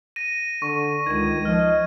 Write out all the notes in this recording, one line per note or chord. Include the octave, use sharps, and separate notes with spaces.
A#6 D#7
D3 C#6 D#7
C#2 D#3 G#6 D#7
F3 D#5 F6